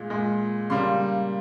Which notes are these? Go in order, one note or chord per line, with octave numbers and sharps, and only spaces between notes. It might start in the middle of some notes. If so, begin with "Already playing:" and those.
Already playing: A#2 G#3
A#2 G#3
C#3 G3 A#3 C6